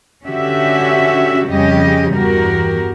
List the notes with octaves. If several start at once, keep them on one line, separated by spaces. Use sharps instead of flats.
D3 C#4 F#4 G4 E5
F2 C#3 G3 C#4 G4 D#5
E2 G2 F#4 G4 A#4